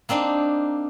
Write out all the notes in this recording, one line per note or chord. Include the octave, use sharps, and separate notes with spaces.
A#3 C4 D4 D#4